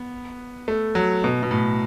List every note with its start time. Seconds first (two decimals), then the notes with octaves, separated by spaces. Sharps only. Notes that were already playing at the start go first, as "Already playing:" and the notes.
Already playing: B3
0.68 A3
0.95 F#3
1.24 B2
1.43 B2
1.51 A2